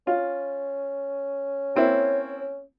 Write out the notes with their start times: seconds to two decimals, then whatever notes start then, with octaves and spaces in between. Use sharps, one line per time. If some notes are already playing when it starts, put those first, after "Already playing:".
0.07 C#4 F4
1.76 A#3 C4 E4 C#5